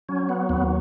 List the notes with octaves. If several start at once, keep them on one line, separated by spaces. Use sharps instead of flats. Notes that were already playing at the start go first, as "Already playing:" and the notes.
F#3 C#4
B3
D#2 B3